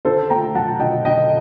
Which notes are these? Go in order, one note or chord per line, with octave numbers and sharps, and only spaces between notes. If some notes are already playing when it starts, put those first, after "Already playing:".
D3 A4 C5
A3 G5 A#5
F#3 F#5 A5
D3 D#5 G5
D3 D#5 G5